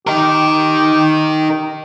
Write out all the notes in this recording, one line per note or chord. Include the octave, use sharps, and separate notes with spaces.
D#4 G4 A#4